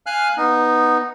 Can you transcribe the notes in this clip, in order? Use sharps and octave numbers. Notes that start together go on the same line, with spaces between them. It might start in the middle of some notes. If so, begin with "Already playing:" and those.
F5 G#5 F6 F#6
B3 D#4